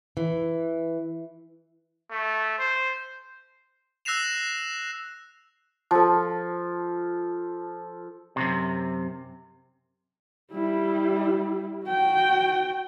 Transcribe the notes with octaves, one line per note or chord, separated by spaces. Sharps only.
E3
A3
C5
E6 F#6 A#6 C7 E7 F7
F3 A4
F#2 A2 C3
G3 E4
F#4 G5